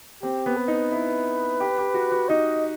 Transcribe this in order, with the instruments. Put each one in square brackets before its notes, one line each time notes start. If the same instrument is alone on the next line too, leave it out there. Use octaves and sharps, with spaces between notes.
[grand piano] C4 [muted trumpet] G4
[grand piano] B3
[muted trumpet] B4
[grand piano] D#4
E4
G4
G4
F#4
F#4
[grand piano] D#4 [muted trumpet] D#5